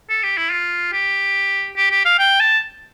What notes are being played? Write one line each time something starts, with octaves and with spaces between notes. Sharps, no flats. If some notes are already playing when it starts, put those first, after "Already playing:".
A4
G4
E4
F4
G4
G4
G4
F5
G5
A5